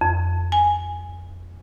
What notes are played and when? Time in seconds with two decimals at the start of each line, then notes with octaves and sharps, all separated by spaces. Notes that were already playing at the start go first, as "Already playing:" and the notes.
0.01 F2
0.52 G#5